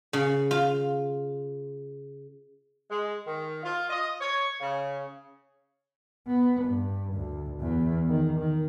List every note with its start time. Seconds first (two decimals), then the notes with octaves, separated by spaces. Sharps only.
0.13 C#3
0.51 F4
2.91 G#3
3.27 D#3
3.63 F4
3.90 D#5
4.21 C#5
4.61 C#3
6.27 B3
6.65 G2
7.14 D2
7.60 E2
8.08 D#3
8.38 D#3